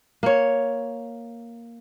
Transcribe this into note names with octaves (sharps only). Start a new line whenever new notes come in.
A#3 C#5